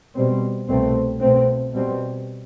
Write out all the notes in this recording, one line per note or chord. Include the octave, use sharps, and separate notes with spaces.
B2 G3 C4
C2 B2 A3 C4
B2 A3 C4
B2 G3 C4